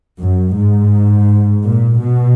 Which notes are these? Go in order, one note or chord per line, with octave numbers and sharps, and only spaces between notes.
F#2
G#2
A#2
B2